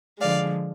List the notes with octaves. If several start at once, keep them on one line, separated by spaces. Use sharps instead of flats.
D3 F3 G#3 D5 F5